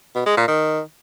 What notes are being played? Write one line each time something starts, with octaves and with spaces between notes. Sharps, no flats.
B2
G#3
A#2
D#3